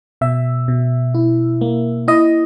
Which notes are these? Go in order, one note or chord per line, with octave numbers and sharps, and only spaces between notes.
B2 E5
B2
E4
A#3
E4 D#5